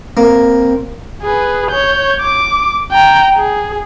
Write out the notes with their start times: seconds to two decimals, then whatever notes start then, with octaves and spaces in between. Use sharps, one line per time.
0.17 A#3 C4
1.23 G#4 B4
1.71 C#5 G6
2.21 D6
2.92 G5 A#5
3.37 G#4